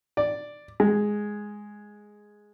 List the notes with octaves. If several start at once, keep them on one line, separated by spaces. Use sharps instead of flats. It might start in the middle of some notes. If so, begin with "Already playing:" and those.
D5
G#3